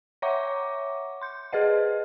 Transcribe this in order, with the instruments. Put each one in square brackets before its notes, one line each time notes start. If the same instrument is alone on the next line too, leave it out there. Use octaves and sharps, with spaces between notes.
[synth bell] C#5 E5 F#5 A#5 C#6 D6
C6 G6
G#4 B4 C5 D#5 F#5